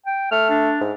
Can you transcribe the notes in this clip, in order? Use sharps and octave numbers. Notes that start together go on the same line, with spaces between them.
G5
A3 F6
D4
G#2